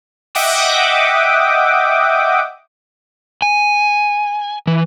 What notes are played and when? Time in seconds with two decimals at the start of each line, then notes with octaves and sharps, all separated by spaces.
0.35 D#5 E5 F#5 G5 D6 D#6
3.42 G#5
4.67 E3